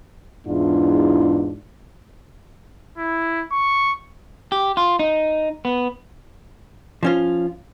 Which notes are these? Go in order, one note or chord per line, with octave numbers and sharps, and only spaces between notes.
E2 G#2 D4 E4 F4
E4
C#6
G4
F4
D#4
B3
F3 C#4 F4